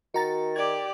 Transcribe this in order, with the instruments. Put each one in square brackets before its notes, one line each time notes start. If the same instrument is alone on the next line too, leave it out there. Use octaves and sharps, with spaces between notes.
[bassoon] D#3 [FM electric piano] F#4 A#5 A6
[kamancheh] G4 D5 [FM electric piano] G#6